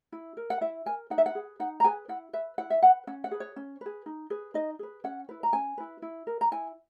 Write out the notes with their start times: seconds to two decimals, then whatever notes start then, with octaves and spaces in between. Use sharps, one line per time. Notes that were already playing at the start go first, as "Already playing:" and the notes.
0.12 E4
0.37 A#4
0.50 F#5
0.61 E4 E5
0.86 A#4 G#5
1.10 D#4 F#5
1.18 E5
1.26 F#5
1.35 G#4 B4
1.60 D#4 F#5
1.80 A#5
1.84 G#4 B4 G#5
2.08 E4 F#5
2.33 B4 E5
2.58 E4 F#5
2.70 E5
2.82 B4 F#5
3.07 C#4 F#5
3.24 F#5
3.31 G#4 B4
3.40 C#5
3.56 C#4
3.81 G#4 B4
4.06 D#4
4.30 G#4 B4
4.54 D#4 D#5
4.79 G#4 B4
5.04 C#4 F#5
5.29 E4 B4
5.43 A#5
5.53 C#4 G#5
5.78 E4 B4
6.02 E4
6.27 A#4
6.41 A#5
6.52 E4 G#5